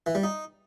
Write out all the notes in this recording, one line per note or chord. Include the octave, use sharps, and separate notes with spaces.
E3
G3
D#4